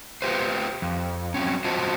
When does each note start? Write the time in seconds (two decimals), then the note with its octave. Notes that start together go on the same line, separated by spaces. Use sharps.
0.22 F4 G4 B4 C5
0.82 F2
1.34 F#3 C4 C#4
1.64 F4 F#4 C5 D#5 A5